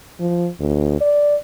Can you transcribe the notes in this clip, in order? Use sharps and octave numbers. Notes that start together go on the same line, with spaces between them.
F3
D2
D5